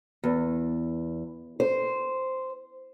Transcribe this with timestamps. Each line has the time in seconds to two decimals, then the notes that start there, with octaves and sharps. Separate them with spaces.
0.24 E2
1.60 C5